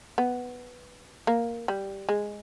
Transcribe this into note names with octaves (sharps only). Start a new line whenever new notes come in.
B3
A#3
G3
G#3